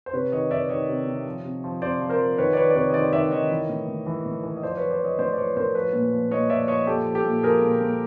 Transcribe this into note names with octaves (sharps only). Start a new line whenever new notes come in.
C5
C3 B4 C#5
D#3 C#5 D#5
D#3 D5 E5
D#3 C#5 D#5
C3
C3
F3
C3
F3
C3 C5 D5
F3
A#4 C5
F3
D#3 B4 C#5
D5
D#3 B4 C#5
D5
C3 B4 C#5
D#5
D#3 C5 D5
D#3 D5 E5
D#3 C#5 D#5
E3
A2
A2
E3
A2
E3
D#5
F3 C5 D5
F3 B4 C#5
C5 D5
F3 C#5 D#5
A2 C5 D5
D5
F3 B4 C#5
A2 A#4 C5
F3 B4 C#5
A#2
F3
A#2 C#5 D#5
F3 D5 E5
F3 C#5 D#5
A#2 G4 A4
F3
G4 A4
A#2
F3 G#4 A#4
A#2
A#2